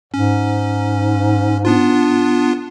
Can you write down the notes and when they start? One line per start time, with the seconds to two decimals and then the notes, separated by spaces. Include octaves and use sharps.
0.14 G#2 C#4
1.65 B3 D4 F4